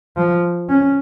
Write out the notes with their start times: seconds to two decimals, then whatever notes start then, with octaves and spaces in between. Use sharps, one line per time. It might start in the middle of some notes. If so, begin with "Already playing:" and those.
0.17 F3
0.70 C#4